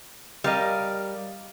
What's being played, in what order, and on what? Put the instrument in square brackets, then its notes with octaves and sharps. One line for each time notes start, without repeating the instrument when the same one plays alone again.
[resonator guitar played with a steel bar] G3 A#4 D#5 [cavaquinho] F5